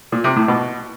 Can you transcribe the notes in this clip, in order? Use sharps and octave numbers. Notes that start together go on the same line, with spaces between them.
A#2
C3
A2
B2